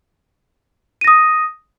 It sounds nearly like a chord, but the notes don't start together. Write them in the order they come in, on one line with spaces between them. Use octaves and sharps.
D#7 A#6 D#6